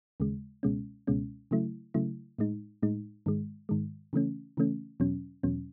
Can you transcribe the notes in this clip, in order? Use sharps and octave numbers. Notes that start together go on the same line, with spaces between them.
D#2 C#3 G#3
C#2 B2 G#3 C#4
C#2 B2 G#3 C#4
C#3 F#3 A3 E4
C#3 F#3 A3 E4
A2 G#3 D#4
A2 G#3 D#4
G#2 D#3 G#3
G#2 D#3 G#3
C#3 E3 A3 C#4
C#3 E3 A3 C#4
E2 B2 F#3 C#4
E2 B2 F#3 C#4